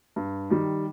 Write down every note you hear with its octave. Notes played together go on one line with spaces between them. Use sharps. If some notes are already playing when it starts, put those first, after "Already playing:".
G2
D#3 G3